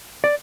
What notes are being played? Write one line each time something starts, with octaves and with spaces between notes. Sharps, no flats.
D5